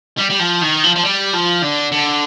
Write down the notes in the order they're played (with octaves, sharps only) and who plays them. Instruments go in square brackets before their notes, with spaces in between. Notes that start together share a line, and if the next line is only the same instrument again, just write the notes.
[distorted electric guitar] G3
G3
F3
D#3
F3
F3
G3
F3
D3
D3